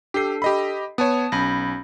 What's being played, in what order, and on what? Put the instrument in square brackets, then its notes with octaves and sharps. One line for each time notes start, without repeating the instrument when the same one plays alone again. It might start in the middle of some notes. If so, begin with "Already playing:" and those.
[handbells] D4 A4 [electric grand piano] G4 C7
[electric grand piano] G4 D#5 B5
[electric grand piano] B3 C#5 [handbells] A5 D#6
[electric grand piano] B1 [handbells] C#4 B5 A#6